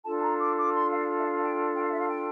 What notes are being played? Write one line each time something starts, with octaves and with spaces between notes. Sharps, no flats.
D4 F4 A4 A5
A5
A#5
D6
D6
C6
F5
E5
F5
G5
G5
F5
E5
F5
G5